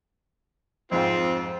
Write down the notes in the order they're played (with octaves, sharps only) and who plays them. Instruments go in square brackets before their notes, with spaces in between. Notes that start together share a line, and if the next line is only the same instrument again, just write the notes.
[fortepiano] F2 G#2 G5 [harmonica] C4 F4